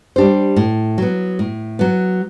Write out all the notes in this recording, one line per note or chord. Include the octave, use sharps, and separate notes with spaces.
G3 D4 G4 C5
A2
F#3 B3
A2
F#3 B3